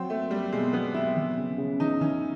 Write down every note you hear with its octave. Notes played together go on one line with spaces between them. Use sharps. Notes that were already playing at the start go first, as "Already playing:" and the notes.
Already playing: F#3 C4
A3 A#3
G3 A#3
B2 G#3
F#3 B3
B2 E4
E3
C#3
C#3
E3 D#4
E3 C#4